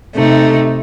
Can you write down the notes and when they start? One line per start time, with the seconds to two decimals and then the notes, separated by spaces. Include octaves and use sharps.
0.16 C3 A3 D#4